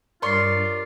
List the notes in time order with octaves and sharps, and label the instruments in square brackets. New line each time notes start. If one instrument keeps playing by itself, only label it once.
[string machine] G2 [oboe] F4 [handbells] A#4 C7 [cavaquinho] C#5 D5 C6